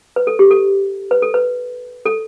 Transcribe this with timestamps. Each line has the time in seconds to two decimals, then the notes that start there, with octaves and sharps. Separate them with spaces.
0.16 B4
0.27 A4
0.39 G4
0.51 A4
1.11 B4
1.22 A4
1.34 B4
2.06 A4